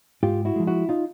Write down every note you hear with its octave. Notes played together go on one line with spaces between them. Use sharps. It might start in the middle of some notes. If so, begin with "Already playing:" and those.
G#2 F4 G4
E4 F#4
F3 G#3
E4 F#4
D#4 F4